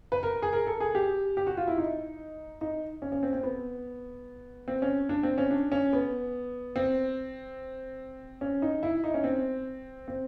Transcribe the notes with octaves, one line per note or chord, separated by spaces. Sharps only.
B4
A#4
G#4
A#4
A4
G#4
G4
G4
F#4
F4
E4
D#4
D#4
C#4
C#4
C4
C4
B3
C4
C#4
D4
C4
C#4
D4
C#4
B3
C4
C#4
D#4
E4
D#4
C#4
C4
C4